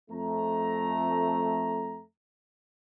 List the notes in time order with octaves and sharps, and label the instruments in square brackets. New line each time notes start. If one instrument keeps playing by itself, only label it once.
[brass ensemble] F2 A3 A#5